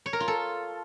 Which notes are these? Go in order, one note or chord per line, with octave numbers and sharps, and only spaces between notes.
C#5
A#4
F4
A4